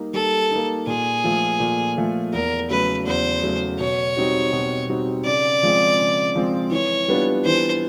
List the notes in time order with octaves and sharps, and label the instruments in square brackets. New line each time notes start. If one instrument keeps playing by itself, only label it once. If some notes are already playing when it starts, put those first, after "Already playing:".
Already playing: [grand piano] G3 A#3 D#4
[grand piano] G3 [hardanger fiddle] A4
[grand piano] A#3 D#4
[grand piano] A#2 [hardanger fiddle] G#4
[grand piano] F3 A3
A#2
F3 A3
[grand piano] E2 [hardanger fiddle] A#4
[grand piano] C#3 F#3 A3 [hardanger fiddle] B4
[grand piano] E2 [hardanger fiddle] C5
[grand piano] C#3 F#3 A3
[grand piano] B2 [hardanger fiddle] C#5
[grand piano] G3 C4 D#4 F#4
B2
G3 C4 D#4 F#4
[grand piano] C#3 [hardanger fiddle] D5
[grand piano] F3 G#3 C4
C#3
F3 G#3 C4
[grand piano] E3 [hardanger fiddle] C#5
[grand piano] G3 B3 D4 F4
[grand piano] E3 [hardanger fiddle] C5